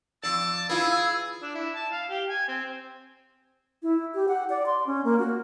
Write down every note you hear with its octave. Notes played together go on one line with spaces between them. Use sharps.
F2 D5 A5 E6
E4 F4 G#4 B4
D4
E4
A5
F5
G4
G#5
C4
E4
G4
F#5
D5
C6
C#4
A#3
F#4